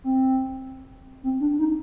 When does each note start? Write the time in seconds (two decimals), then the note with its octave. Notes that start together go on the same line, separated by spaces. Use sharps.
0.04 C4
1.23 C4
1.41 D4
1.59 D#4